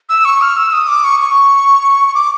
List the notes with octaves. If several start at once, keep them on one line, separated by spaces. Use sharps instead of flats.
E6
C#6
F6
E6
D#6
D6
C#6
C#6
C#6
D6